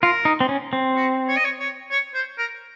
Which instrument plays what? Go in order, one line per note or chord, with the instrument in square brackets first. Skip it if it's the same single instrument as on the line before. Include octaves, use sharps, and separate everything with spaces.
[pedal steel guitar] F4 [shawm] A#4
[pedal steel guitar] D#4
C4
C#4
C4
[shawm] F#4
C#5
D#5
C#5
C#5
C#5
C5
A#4